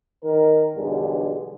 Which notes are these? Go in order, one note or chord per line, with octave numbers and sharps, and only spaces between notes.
D#3 A#4
B1 E2 G2 D3 E3 G#3